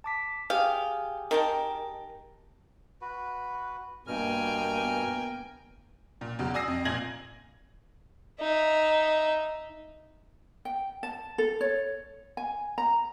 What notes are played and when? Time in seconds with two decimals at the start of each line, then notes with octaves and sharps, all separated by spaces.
0.04 A5 D6 B6
0.50 G4 G#4 F5 G5 G#5
1.31 D#3 A#4 G5 A5
3.01 F#4 B4
4.07 G2 B2 A#3 B3 A#4 G5 G#5 F6
6.21 A#2
6.39 E2 C#3 F#3
6.54 D5 G#5 D#6 E6 A#6 C7
6.68 F2
6.85 A#2 G#5 G#6 A#6 F#7
8.40 D#4 E5
10.65 G5
11.03 A5
11.38 A4
11.61 C#5
12.37 G#5
12.78 A#5